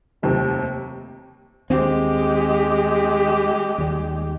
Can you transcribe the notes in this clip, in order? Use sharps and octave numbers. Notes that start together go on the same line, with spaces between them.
F1 D#2 C3
D#2 G#3 C4 G4
D#2 G3